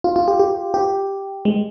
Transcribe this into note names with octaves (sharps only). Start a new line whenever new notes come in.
F4
F4
G4
G4
G4
G#3